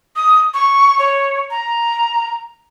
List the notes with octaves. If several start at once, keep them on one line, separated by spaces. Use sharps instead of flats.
D#6
C#6
C#5
A#5